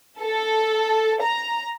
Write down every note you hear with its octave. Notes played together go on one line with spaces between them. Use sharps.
A4
A#5